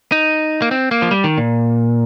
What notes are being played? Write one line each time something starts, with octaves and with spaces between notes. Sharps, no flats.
D#4
A#3
C4
A#3
F3
G3
D#3
A#2